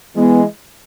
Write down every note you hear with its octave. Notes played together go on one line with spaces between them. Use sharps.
E3 G#3 B3